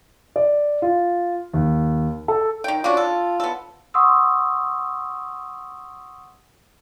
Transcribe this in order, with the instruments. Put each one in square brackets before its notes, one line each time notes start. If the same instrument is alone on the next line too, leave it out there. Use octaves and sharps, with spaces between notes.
[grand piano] D5
F4
D#2
A4
[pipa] D#3 G5
[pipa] C#3 D4 F#4 [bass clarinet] F4
[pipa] A4
B3 A4
[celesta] F#5 C6 C#6 D#6 E6